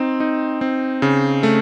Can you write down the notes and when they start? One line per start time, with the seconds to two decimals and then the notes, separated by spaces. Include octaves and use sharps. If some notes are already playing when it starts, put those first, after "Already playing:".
Already playing: C4 D#4
0.20 D#4
0.61 C4
1.02 C#3
1.43 A3